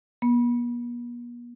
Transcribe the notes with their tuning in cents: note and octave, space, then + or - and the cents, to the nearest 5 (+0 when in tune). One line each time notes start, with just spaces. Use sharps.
B3 -45